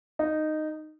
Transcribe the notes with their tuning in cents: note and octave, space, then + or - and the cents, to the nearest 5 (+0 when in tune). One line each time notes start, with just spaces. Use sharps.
D#4 -10